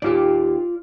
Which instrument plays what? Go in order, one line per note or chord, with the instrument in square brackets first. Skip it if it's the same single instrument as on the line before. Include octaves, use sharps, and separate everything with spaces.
[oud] D#2 G4 [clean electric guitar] F4 D5